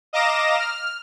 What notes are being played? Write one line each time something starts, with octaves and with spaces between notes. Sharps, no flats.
D#5 F5 A#5 D6 A#6 E7
F6